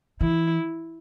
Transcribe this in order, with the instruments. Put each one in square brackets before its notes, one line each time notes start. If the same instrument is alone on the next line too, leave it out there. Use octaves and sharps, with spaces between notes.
[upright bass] E3 [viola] E4